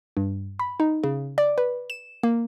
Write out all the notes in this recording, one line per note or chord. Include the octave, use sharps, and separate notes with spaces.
G2
B5
D#4
C#3
D5
B4
E7
A#3